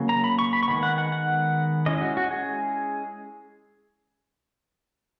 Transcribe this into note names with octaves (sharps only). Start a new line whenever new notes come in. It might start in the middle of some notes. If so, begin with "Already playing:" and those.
Already playing: C#3 F#3 A#3
A#5
B5
C#6
B5
C#6
D#3 G#3 B3 B5
F#5
F#5
F#5
G#3 C#4 E4 D#5
F#4
F#4
G#4